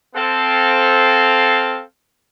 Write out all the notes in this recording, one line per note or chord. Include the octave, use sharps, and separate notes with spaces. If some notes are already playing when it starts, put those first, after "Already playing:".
C4 A4 F5